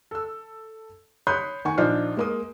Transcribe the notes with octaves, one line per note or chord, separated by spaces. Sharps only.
A4 E6
C#5 B5 C6 D#6 F#6 G6
D#3 F#5 G#5 C#6
A#1 D4 D#4 F4 C5 F6
G#3 A#3 D#6